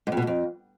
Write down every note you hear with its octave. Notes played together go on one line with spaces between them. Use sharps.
G#2
F2
B2
G#2
F2